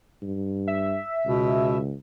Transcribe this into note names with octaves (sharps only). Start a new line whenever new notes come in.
G2
E5
C#2 B2